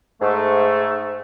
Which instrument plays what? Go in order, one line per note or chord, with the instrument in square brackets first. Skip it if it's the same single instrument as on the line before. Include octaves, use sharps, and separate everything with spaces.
[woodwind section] G#2 A3